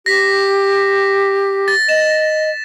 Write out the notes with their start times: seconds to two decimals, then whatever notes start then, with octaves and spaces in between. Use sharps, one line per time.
0.06 G4 A#6 B6
1.68 A6
1.89 D#5 E7